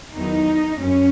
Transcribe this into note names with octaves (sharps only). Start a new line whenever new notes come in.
E2 D#3 F#3 D#4
F#2 C#4